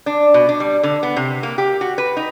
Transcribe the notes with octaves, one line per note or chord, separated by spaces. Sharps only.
D4
B2
D4
G3
D3
B3
C3
A#3
G4
F#4
B4
D#4